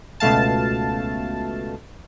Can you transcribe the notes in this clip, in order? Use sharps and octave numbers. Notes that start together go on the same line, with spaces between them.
C#2 B2 A3 F5 A5